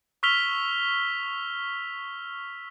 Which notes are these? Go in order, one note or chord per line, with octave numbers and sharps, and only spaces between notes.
C#6 E6 F6 B6 F7 G7